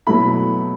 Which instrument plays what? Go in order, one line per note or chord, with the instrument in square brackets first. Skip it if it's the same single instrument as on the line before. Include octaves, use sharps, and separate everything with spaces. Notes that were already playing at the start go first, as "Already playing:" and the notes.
[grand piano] B2 F#3 A3 E4 B5